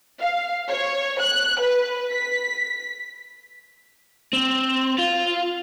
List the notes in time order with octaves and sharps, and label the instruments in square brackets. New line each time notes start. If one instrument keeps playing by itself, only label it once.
[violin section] F5
C#5
F#6
B4
B6
[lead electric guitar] C4
F4